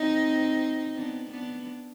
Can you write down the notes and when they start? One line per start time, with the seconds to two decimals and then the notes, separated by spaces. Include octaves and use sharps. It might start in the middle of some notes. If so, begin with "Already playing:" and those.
Already playing: C4 D#4
0.95 B3 D4
1.30 B3 D4